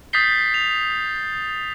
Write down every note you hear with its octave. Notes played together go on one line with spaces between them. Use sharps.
D#6 G6 A6 B6 C7 G7
F7